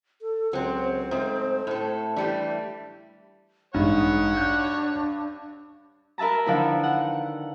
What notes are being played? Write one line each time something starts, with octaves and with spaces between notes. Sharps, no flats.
A4
C#2 F#3 C4 C5
G#2 A3 C4
A2 A4
E3 G3 A3 D4
A1 G2 G#3 D#4 C#5 F#5
D4 F#6 G6
A#4 B4 E5 A5 A#5
D3 D#3 F3 E4
F#5